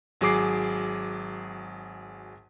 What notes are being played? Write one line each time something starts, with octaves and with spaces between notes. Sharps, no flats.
G#1 F#3 G#4 D6 C7